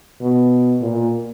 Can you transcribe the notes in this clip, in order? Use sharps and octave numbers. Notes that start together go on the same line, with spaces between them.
B2
A#2